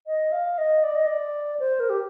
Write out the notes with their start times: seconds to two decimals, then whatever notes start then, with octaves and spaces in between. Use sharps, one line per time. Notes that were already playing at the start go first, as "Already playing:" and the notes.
0.07 D#5
0.32 F5
0.58 D#5
0.84 D5
0.95 D#5
1.06 D5
1.60 C5
1.80 A#4
1.90 G4